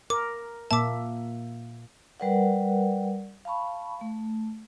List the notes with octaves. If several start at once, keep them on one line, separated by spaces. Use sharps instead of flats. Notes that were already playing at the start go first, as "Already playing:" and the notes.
A#4 D6
A#2 A#3 E5 A5 D6
G3 A#4 B4 D5 F#5
F5 A5 B5 C#6
A3